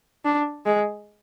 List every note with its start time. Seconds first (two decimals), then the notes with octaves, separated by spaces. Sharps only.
0.25 D4
0.66 G#3